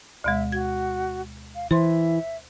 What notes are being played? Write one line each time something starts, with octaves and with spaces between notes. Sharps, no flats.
D2 B2 G#3 E5
F#4 G#6
F5
E3 C5 E5 C6